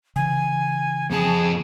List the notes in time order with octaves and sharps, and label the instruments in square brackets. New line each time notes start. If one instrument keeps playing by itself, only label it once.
[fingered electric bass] C#3 E3 [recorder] G#5
[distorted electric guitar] F2 A5 [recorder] G#4